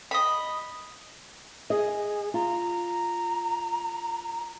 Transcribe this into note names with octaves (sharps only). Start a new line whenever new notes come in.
D#5 B5
G#4 D#5
F4 A#5